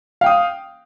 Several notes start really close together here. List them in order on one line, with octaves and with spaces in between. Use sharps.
F5 G5 D#6